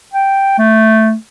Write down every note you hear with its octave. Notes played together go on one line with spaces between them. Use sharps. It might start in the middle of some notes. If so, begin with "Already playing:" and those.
G5
A3